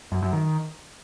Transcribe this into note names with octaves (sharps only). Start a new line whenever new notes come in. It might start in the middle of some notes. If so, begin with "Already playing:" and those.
F#2
F#2
D#3